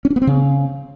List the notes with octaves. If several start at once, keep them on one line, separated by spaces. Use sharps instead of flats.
C#4
D4
B3
C4
C#3